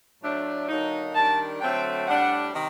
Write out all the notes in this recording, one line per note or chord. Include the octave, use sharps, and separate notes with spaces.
A2 F#3 A3 D4
D3 F#3 A#3 D#4
D#3 G3 D4 A5
D3 F#3 A3 C4 G5
A2 G3 D4 F#5
C3 D#3